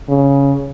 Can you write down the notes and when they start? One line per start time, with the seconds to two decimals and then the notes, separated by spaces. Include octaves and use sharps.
0.09 C#3